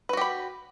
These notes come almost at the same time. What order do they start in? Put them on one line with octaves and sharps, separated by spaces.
B4 F#4 G4 B5